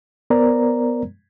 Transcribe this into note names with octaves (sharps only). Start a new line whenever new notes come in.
B3 A#4 C5 D5 A#5